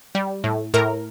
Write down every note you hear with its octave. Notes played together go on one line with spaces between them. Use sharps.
G3
A2
A2 A#4